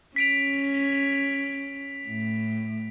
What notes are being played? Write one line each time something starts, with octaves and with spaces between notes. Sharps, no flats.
C#4 B6 D7 F7
A2